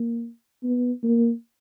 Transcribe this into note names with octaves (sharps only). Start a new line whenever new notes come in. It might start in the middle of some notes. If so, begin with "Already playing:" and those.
Already playing: A#3
B3
A#3